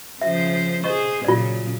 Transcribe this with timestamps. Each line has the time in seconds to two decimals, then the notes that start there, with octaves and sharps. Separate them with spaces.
0.22 C#3 F3 C5 E5
0.84 G#4 C5 D#5 C#6
1.25 A#2 C#3 F#3 F4 D5